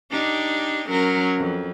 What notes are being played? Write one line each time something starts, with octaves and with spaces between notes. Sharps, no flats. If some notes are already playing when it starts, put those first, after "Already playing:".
D4 D#4 G4
F#3 C#4 A#4
F2